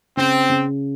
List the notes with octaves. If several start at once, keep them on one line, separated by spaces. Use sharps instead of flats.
C#3 C4
C#3